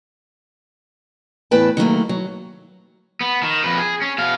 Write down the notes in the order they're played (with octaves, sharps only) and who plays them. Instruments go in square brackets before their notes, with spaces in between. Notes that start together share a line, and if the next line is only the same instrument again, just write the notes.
[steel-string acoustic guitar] E2 A2 B4 G5 A5
D#3 F#3 A3 A#3
F#3
[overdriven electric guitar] B3
D#3
F2 B4
G#4
C#4
B2 F5